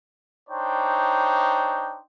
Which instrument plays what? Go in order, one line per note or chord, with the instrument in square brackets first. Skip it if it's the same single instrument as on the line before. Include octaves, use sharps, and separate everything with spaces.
[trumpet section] D4 D#4 C5 C#5 G5